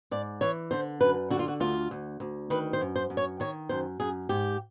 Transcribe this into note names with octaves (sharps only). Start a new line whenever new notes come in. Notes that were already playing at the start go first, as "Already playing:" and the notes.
G#2 D5
E3 C#5
D3 C5
F#2 B4
D3 F#4
F4
F#4
D2 F4
D2
D2
D#3 B4
C5
F#2
C5
F#2
C#5
D#3 C#5
F#2 C5
F#2 G#4
G#2 G4